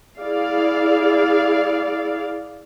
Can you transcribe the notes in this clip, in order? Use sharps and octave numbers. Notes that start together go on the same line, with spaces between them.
E4 G#4 D5 F5